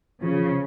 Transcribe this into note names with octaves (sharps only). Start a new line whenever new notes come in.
C#3 F3